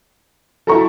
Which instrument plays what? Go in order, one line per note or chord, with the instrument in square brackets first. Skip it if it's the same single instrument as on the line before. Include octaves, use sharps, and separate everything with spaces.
[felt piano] F#3 A#5 C#6 [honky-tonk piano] E4 A4